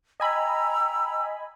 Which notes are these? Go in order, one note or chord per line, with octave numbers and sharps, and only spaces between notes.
D#5 G5 G#5 A#5 B5 E6